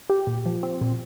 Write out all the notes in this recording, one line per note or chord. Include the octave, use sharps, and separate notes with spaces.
G4
A#2
F3
C4
A#2